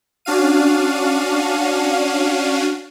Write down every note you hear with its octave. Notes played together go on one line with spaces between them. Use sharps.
C#4 D4 F#4 F5 D#7